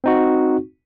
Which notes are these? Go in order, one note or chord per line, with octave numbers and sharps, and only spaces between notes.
C4 D#4 F#4